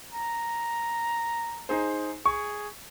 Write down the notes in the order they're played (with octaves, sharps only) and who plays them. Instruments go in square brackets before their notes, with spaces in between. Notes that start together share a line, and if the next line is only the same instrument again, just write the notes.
[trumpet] A#5
[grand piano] D#4 G#4 C5
[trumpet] G#4 [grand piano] C#6